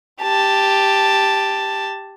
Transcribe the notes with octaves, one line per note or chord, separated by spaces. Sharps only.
G4 A5